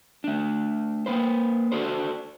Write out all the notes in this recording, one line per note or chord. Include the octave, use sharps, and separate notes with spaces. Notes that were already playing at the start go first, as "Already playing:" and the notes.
A3 D4
A#3 B4 C5
D4 F#4 A4 C5